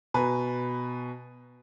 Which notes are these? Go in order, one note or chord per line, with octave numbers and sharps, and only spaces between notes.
B2 B4 G#5 A#5